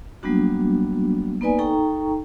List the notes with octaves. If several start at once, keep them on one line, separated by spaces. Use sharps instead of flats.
F#3 G3 A#3 B3 D4 F#4
A#3 B3 D#4 B4 D5 G#5
D#4 A4 G5 A#5 C#6